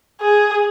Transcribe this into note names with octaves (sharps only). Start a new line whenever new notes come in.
G#4